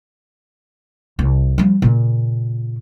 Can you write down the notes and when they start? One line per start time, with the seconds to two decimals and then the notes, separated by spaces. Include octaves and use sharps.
1.19 C2
1.58 F3 G3
1.82 A#2 C#3